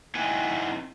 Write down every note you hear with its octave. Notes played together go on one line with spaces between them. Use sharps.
C4 D#4 E4 B4 F#5 G#5